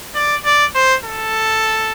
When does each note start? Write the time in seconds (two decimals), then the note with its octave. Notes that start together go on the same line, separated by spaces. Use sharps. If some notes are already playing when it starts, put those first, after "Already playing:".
0.15 D5
0.45 D5
0.75 C5
1.05 A4